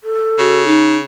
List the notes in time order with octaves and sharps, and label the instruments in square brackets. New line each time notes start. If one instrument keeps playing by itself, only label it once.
[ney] A4
[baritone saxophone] C#3 [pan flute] F#4
[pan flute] D#4